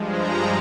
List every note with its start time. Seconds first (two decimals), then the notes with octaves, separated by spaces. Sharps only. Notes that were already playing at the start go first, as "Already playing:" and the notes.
Already playing: G2 F3 G#3
0.11 A#5